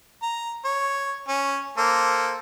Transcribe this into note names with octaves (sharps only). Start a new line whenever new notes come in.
A#5
C#5
C#4
A#3 A4 C5